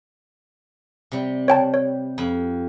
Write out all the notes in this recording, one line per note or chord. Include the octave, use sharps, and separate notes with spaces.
C3 G3
C#5 G5 A5
C#5
F2 B5